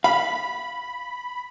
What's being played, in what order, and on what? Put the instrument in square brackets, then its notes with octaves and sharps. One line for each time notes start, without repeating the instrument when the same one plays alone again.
[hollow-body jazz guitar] F5 [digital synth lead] B5